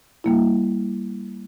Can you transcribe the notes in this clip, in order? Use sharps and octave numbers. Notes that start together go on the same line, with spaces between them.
G3 A#3 E4